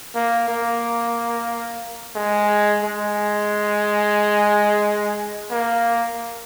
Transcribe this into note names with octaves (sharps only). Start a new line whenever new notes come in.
A#3
A#3
G#3
G#3
A#3